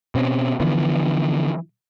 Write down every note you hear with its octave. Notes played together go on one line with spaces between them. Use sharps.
B2 C4 C#4
D3 E3 F3 B3